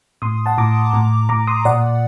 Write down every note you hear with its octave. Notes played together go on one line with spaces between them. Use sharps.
A2 C6 D#6
F#5 A5
A2 A#5 D6
A2
A2 A#5 D6
C6 D#6
A#2 D5 F#5